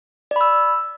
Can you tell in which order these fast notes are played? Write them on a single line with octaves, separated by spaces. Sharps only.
D5 B5 E6